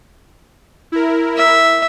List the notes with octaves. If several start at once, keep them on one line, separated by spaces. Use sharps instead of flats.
E4 A#4
E5